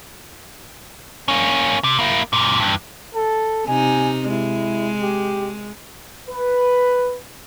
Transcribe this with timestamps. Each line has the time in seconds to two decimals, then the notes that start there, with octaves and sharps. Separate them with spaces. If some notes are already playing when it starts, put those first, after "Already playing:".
1.28 A#3 C#4
1.84 C3
1.99 A#3 E4
2.33 F#2 A#2
2.60 G2 E3
3.15 A4
3.67 C3 D#4 G#5
4.30 G#3 E4
5.02 G4
6.28 B4